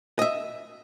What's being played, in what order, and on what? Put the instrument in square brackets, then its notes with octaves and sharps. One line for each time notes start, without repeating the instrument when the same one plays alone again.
[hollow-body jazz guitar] D#5 E5